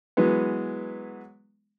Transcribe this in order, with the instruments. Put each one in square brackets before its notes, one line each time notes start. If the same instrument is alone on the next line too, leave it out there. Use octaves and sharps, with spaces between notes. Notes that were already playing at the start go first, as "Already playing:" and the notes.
[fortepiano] E3 F#3 G#3 B3